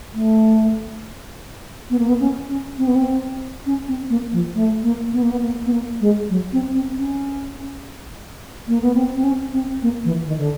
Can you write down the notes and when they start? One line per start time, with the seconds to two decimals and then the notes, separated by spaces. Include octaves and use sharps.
0.14 A3
1.90 B3
1.99 A#3
2.09 B3
2.20 C#4
2.49 C#4
2.78 C4
2.87 B3
2.96 C4
3.66 C#4
3.88 C4
4.10 A#3
4.33 F3
4.55 A3
4.83 A#3
5.13 B3
5.22 A#3
5.32 B3
5.42 A#3
5.66 B3
5.72 A#3
6.01 G#3
6.30 F#3
6.53 C4
6.74 C4
6.97 C#4
8.68 A#3
8.82 B3
8.95 C4
9.16 C4
9.24 C#4
9.53 C4
9.83 A#3
10.05 E3
10.26 D#3
10.38 D3